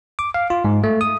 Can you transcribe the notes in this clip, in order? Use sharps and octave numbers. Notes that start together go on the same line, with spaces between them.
D6
F5
F4
G#2
A3
D#6